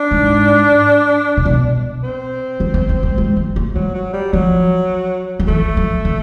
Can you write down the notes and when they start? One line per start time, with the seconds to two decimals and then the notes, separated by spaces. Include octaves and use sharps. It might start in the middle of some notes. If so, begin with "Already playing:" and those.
Already playing: D4
0.11 G#2
1.37 A#2
1.45 B2
2.03 C4
2.60 F3
2.74 B3
2.89 A#3
3.03 G#3
3.18 G#3
3.36 A#3
3.56 A3
3.75 F#3 G3
3.94 F#3
4.13 G3
4.32 F3 F#3
5.39 F3
5.48 E3 A3
5.77 F3
6.05 D3